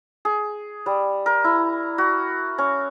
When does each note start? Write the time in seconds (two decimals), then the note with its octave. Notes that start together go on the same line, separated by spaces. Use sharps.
0.25 G#4
0.86 G3
1.26 A#4
1.44 E4
1.98 F#4
2.58 C#4